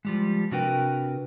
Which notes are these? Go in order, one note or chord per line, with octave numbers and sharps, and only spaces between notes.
F3 G3 G#3
C3 D4 F#4 A#4 B4 G5